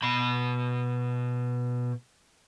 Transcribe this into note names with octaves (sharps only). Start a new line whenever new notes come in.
B2 B5